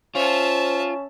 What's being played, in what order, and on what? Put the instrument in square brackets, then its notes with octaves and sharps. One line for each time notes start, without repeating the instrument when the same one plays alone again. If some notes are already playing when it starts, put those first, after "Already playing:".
[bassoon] C#4 [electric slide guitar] F4 [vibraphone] C5 [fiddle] E5 A5